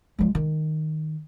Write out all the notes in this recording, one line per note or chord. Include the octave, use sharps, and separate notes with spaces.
F3 G#3
D#3